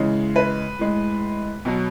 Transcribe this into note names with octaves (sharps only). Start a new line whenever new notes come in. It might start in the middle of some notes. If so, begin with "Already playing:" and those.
Already playing: C#3 E3 G#3
B4
A2 G#3
B2 F#3